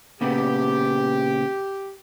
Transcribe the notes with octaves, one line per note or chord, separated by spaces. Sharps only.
A#2 C#3 B3 G4